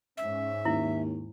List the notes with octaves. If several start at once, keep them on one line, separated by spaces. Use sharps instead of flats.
G#2 C#4 E5
D#2 E4